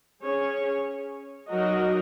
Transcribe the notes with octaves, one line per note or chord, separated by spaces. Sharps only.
C#4 G#4 C#5
F#3 D#4 F#4 A#4 D#5